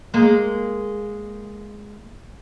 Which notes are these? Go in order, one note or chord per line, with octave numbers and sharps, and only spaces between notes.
G#3 A#3